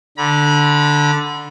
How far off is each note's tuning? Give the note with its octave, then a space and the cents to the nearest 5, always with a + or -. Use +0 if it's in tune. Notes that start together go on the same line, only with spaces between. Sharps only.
D3 +0 B5 -40